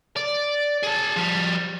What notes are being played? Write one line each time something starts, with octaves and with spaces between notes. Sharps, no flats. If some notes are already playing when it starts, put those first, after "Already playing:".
D5
G#4 A5
F3 G3